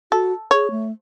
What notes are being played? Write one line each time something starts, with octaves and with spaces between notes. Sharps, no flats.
F#4 A4
G#4 C#5
A3